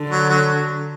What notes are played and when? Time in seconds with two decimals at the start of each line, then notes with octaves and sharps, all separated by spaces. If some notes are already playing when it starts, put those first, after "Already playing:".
Already playing: D3
0.10 F#3
0.29 F#3